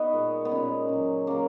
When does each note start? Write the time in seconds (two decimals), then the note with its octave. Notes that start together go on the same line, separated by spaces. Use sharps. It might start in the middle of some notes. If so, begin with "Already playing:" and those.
Already playing: B3 D#4 F#4
0.13 A#2 G#3
0.45 B3
0.51 A#2 G#3 C#4
0.89 C#3 F#3
1.27 C#3 F#3 A#3